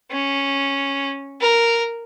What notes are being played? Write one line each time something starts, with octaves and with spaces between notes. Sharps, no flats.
C#4
A#4